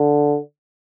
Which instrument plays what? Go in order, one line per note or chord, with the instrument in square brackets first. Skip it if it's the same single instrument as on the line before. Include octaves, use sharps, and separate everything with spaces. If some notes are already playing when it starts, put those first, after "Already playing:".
Already playing: [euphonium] D3